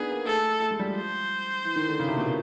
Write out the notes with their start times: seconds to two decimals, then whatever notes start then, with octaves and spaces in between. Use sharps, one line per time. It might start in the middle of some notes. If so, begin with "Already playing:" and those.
Already playing: B3 D4 D#4 G#4
0.10 A#3
0.27 A3 A4
0.62 A3
0.71 G#3
0.79 G3
0.88 F3
0.97 C5
1.65 E3
1.76 D#3
1.88 D3
2.00 C#3
2.08 C3
2.17 B2
2.25 A#2